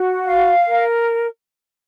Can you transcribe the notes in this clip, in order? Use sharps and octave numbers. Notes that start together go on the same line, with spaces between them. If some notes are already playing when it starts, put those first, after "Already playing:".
Already playing: F#4
F5
A#4